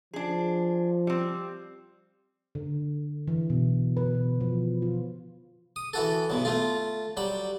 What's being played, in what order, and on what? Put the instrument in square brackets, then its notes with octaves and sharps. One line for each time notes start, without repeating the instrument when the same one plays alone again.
[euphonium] F3 [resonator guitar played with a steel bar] D4 G#4
[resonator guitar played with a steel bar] G3 C4
[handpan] D3
E3
B2
B4
B2
F3
F4
[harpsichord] D#6
E3 F#4 A4
B1 B2 F#3
A3 F4
F#3 G3 B5